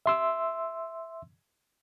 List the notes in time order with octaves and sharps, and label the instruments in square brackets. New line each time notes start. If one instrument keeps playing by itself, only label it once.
[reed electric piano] E5 C6 E6